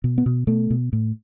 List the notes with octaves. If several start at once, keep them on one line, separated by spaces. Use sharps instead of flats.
B2
B3
B2
B2 A3
B2
A2